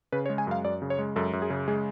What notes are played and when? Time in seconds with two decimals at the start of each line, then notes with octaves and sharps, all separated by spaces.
0.12 C#3 B4
0.26 C#5
0.30 G#3
0.38 G#5
0.47 F#2 F5
0.64 F#2 D5
0.82 C#3
0.90 C#5
0.99 G#3
1.16 F#2 A4
1.33 F#2
1.42 G#4
1.50 C#3
1.68 G#3 G#4